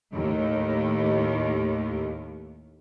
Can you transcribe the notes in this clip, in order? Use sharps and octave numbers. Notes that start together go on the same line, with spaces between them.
D#2 A2